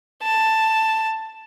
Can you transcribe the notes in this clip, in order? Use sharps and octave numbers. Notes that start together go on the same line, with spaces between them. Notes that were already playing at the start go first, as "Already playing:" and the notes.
A5